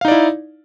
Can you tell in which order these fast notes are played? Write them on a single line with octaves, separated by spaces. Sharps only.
F5 D#4 D5 E4